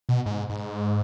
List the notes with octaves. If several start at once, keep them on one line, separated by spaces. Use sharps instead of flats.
B2
G#2
G#2